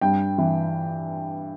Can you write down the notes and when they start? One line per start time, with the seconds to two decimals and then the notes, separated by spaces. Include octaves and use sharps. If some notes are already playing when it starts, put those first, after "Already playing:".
0.01 G2 G5
0.38 E3